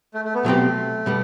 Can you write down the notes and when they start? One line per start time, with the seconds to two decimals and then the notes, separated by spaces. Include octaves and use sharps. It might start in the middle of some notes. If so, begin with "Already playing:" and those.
0.14 A3
0.25 A3
0.35 B3
0.44 B2 F#3 A3 C4 G4
1.06 B2 G3 B3